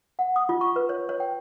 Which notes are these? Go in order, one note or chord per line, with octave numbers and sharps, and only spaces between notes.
F#5
D#6
F4
C#6
B4
C#5
C#5
G5